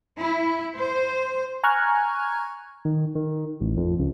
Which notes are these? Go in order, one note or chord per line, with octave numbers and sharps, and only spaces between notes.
E4
C5
G#5 A#5 C#6 F6 F#6 G#6
D#3
D#3
A1
F2
C#2